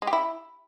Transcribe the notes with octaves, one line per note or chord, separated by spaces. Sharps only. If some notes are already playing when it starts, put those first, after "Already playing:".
G#3
G4
E4